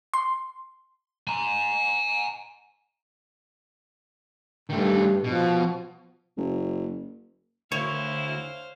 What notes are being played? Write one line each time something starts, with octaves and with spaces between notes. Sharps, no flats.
C6
G#5 A#5
G2 D#3 A3
B2 F3
F#1
D2 E4 C5 C#5 F5